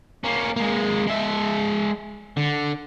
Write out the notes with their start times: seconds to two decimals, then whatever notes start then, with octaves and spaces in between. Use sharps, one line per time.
0.24 A#3 C#4
0.56 G#3 A#3
1.07 G#3 E5
2.37 D3